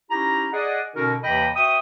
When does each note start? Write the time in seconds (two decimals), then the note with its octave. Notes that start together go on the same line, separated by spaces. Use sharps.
0.11 C#4 D#4 E4 G4 A#5
0.53 G#4 D5 D#5 F#5
0.96 B2 D3 C#4 D#4 F#4 A#4
1.23 D#2 C3 E3 D#5 G5 B5
1.56 F#4 C5 E5 G5 D#6